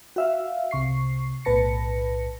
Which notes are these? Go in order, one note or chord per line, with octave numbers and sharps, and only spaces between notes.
F#4 E5 F5
C2 C3 C#6 C7
B1 A2 B4 A5 A#6 C#7